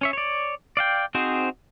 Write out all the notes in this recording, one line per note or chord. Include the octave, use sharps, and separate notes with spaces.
C#4 C#5 E5
C#5 D5
D5 F5 G5
C4 D#4 F#4 G#4 C5